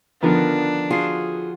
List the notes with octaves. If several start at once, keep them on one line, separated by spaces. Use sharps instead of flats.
D3 D#3 F3 B3 D4 F4 A#4
F4 F#4 G#4 C6 C7